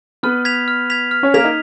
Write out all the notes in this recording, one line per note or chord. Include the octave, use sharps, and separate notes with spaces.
B3 B4 F6
G#6 B6 F7
F6
G#6 B6 F7
F6
C#4 C#5
A#3 A#4 G#6 B6 F7
D#4 D#5